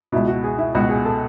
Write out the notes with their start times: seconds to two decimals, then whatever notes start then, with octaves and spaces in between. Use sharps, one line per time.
0.12 C#2 B2 E4
0.28 F#4
0.44 G#4
0.58 E4
0.75 C#2 B2 F#4
0.89 G#4
1.05 A4